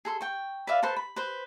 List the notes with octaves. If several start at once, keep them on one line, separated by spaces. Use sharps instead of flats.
G#4 A4 C6
G5 C#6
B4 D5 E5 F5
A4 B4 C5 A5
B5
B4 C5